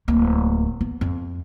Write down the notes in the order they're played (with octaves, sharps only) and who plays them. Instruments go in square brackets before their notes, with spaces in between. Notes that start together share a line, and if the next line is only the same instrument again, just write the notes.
[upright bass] D1 A#3
B3
F2